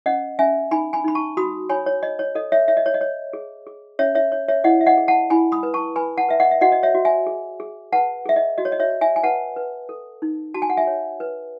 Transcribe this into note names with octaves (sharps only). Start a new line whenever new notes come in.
C#4 D#5 F#5
C#4 E5 G#5
D#4 G#5 B5
G#5 B5
D#4 B5
A5 C#6
F#4 B5 D#6
C#5 G#5 B5
C#5
C#5 D#5
C#5
A4 D#5
C#5 E5
C#5 E5
D#5
C#5
D#5
C#5
G#4
G#4
C#4 C#5 E5
C#5 E5
C#5
C#5 E5
E4 D#5 F#5
E5
D#5 F#5
G#4
F#5 A5
E4 G#5 B5
B5 D#6
B4
A5 C#6
B4 G#5 B5
F#5 A5
B4 E5
D#5 F#5
E5
F#4 D#5 F#5
D#5
C#5 E5
F#4
E5 G#5
G#4
G#4
B4 F#5 A5
G#4 E5
D#5
F#4 D#5
C#5
D#5
C#5 E5
C#5
E5 G#5
G#5
B4 F#5 A5
B4
A4
D#4
F#4 A5
G#5
F#5
E5 G#5
C#5
B4